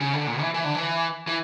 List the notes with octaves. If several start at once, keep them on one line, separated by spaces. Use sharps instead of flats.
C#3
D3
A#2
E3
E3
D3
E3
E3